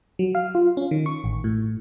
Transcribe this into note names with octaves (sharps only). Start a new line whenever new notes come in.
F#3
F5
F4
C#4
D#3
C#6
A1
A2